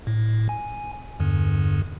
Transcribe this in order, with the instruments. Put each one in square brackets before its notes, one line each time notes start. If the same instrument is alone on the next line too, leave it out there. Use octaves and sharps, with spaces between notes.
[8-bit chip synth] A2
G#5
E2 G2 D3